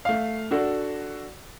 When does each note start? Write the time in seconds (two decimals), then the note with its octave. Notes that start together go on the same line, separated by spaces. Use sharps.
0.05 A3 F5
0.51 D4 F#4 A4